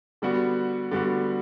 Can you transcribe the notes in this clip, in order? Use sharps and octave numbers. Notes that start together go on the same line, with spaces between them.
D3 G3 B3 F#4
D3 G3 B3 F#4